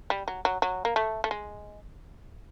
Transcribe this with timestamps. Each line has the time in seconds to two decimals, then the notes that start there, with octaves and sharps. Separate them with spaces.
0.10 G3
0.28 F#3
0.45 F#3
0.62 F#3
0.85 A#3
0.96 A3
1.24 A3
1.31 G#3